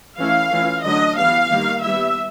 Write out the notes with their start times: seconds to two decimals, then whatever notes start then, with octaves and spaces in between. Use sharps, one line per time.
0.18 E3 A3 C#4 E4 F5
0.50 E3 A3 C#4 F4
0.84 D3 F#3 A3 D4 D#5
1.17 E3 G3 B3 F5
1.50 D#3 G3 A#3
1.83 G3 B3 E4 E5